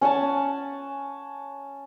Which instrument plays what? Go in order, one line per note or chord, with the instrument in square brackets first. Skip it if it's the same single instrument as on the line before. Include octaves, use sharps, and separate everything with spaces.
[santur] C#4 F#5 G#5 A5